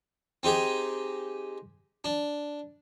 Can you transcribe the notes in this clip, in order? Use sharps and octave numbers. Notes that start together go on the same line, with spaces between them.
C4 D#4 G4 G#4
D4